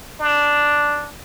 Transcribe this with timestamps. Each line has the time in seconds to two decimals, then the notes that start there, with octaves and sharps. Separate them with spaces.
0.20 D4